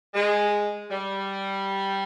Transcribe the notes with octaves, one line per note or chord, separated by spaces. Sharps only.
G#3
G3